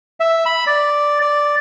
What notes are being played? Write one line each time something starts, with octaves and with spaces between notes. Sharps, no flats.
E5
B5
D5
D5